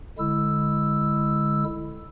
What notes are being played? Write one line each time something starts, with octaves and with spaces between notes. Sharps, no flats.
D3 G#3 E4 E6